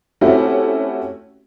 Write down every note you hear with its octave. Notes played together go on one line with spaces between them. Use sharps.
A3 C4 C#4 E4 F#4 G4